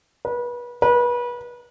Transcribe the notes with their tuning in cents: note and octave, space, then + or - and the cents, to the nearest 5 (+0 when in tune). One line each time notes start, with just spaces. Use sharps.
B4 -30
B4 -30